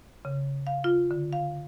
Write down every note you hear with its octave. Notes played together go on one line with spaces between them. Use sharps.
C#3
F5
F4
D3
F5